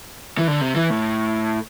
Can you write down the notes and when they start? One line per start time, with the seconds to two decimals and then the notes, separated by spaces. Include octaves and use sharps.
0.38 E3
0.48 D3
0.61 C3
0.75 E3
0.90 A2